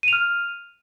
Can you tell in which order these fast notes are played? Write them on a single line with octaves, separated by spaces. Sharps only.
D#7 F7 F6